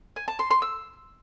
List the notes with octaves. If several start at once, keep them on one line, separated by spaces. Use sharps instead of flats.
G#5
A5
C6
C6
E6